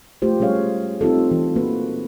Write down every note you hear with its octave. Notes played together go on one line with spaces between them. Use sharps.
A3 F4 G4 C5
G3 C#4 G#4 C#5 F5
C4 D#4 F4 G4 A4
E3
A#3 F#4 B4